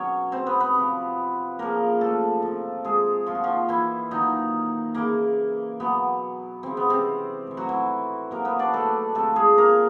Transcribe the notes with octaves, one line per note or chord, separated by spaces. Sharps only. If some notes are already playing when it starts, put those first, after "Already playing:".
Already playing: B2 F#3 C#4 C#5
C4 C5
B3 B4
B3 B4
C3
F3
C#3 F3 A#3 A#4
A3 A4
C3 F3
G#3 G#4
A#2 F3 F4
F#4
F3 F4
E3 E4
A#2 D#3 F#3 D#4
C#3 E3 A#3
B2 F#3 B3
C#3 E3 C4
B3
C3 C4
A2 E3
F#3 F#4
E3 E4
B2 F#3 A#3 A#4
B3 B4
D4 D5
A3 A4
C3 F3 A3 A4
G#3 G#4
A#3 A#4